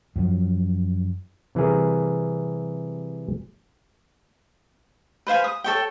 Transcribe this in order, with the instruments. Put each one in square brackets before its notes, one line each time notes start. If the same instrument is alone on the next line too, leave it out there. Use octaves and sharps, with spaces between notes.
[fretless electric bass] F#2 F3 F#3
[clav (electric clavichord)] C3 E3 G3 G#4 A#4
[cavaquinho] B4 C5 F5 G#5
D#6
A4 C#5 G5